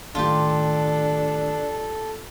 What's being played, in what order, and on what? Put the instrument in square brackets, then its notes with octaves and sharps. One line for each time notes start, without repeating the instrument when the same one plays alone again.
[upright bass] A2 D#3 [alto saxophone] D4 [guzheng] F4 G4 [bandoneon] A4